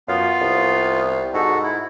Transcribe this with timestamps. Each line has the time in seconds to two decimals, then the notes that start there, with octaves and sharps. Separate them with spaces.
0.08 F#2 B3 F4 F5
0.41 C2
1.34 G#2 F#4 A4
1.63 E4